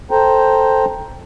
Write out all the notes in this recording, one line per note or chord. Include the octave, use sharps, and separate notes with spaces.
A4 C5 G5 A#5